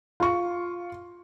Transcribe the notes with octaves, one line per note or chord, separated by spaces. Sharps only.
F4 C#6